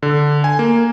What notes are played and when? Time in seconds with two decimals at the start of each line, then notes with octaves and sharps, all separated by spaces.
0.03 D3
0.44 G#5
0.59 A#3